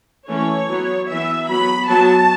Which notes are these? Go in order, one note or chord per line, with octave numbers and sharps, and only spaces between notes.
E3 A3 C#4 C#5
F#3 B3
E3 B3 E5
F#3 B3 B5
F#3 B3 A5